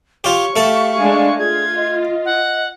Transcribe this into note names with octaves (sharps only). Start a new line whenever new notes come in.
F4 G4 C#5 C#6
A3 G4 A4 F5
G#3 D4 G#5
F4 G#4 G#6
D#5
F#5